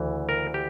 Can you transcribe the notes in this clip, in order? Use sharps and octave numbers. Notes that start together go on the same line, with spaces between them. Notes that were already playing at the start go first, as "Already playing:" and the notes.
Already playing: D2 C#3 E3
A#4
G4